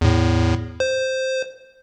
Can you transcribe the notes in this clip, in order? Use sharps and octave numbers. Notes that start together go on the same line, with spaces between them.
E2 A2
C5